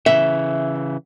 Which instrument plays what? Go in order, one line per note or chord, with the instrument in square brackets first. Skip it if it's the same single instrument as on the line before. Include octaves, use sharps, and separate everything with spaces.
[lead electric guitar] C#3 E3 [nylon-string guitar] E5